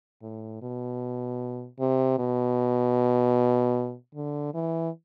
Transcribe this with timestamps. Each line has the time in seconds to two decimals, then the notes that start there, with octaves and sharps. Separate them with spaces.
0.22 A2
0.62 B2
1.79 C3
2.19 B2
4.15 D3
4.54 E3